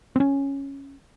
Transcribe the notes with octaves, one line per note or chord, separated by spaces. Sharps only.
C4 C#4